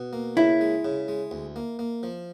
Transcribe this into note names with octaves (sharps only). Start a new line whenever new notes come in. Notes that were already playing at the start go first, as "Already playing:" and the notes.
Already playing: B2
A#3
C#3 E4
G#3
C#3
G#3
D2
A#3
A#3
F3